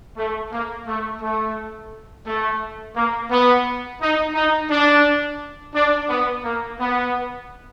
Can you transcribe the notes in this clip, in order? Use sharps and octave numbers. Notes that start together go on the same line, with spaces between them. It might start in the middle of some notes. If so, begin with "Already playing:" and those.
A3
A#3
A3
A3
A3
A#3
B3
D#4
D#4
D4
D4
B3
A#3
B3